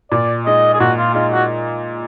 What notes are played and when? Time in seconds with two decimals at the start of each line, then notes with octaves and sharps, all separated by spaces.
0.11 A#2 D5
0.46 G#3 D#4 D#5
0.74 G#4
0.80 A#2 F#4
0.98 F4
1.14 G#3 D#4 F4
1.32 F#4